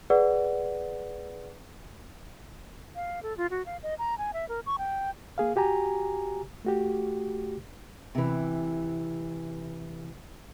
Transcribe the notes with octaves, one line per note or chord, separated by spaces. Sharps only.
G#4 B4 D5 F#5
F5
A4
F4
F#4
F5
D#5
A#5
G#5
E5
A#4
C#6
G5
A#3 G#4 F5
F#4 G4 G#5 A#5
A3 F#4 G4
C3 E3